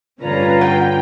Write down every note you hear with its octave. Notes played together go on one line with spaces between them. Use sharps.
G2 D3 C#4 F4 B4 C#5 D5 A#5
F#5 G5